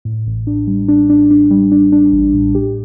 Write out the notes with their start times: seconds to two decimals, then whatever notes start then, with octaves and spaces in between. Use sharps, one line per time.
0.05 A2
0.27 A1
0.47 D4
0.67 G3
0.88 D4
1.10 D4
1.31 D4
1.51 G3
1.72 D4
1.92 D4
2.13 A1
2.33 A2
2.55 G4